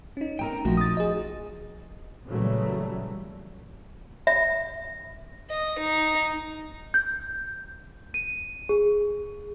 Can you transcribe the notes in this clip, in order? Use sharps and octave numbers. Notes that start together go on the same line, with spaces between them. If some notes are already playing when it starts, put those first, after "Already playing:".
C#4 D#4
B3 C4 A#4 G5 A#5
A#1 F3 A3 D#4 F#4
D#6 A6
G#4 D#5
A#2 C#3 E3 F#3 G3 A3
E5
D#5
D#4
G6
D#7
G#4